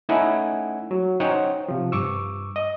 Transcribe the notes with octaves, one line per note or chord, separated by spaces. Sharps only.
A3 C#4 D#4 E4 F#5 G#5
F#3
C#4 D#4 C5 C#5 F#5 G5
C3 F3
G2 C#6 D6 E6
D#5 D#6